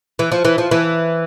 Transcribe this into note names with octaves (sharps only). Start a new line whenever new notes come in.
E3
F3
E3
F3
E3